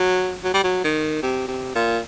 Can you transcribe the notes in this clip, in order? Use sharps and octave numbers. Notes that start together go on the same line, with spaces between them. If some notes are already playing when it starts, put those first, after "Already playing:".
Already playing: F#3
F#3
G3
F#3
D#3
C3
C3
A#2